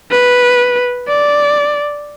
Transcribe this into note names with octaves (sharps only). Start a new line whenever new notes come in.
B4
D5